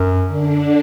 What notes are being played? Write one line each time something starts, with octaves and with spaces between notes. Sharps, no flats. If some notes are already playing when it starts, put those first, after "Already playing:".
Already playing: F#2
D3 D4